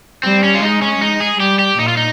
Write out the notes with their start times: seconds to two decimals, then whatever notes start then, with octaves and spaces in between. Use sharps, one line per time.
0.23 G3 C4
0.44 C#4
0.54 F4
0.62 G#3 D#4
0.82 C#4
1.01 G#3 D#4
1.20 G#4
1.40 G3 G4
1.59 G4
1.78 A#2 D#4
1.88 F4
1.97 D#4